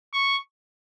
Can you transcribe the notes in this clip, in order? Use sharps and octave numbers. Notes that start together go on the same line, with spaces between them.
C#6